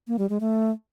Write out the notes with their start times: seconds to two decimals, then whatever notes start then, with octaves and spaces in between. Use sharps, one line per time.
0.08 A#3
0.19 G3
0.29 G#3
0.40 A3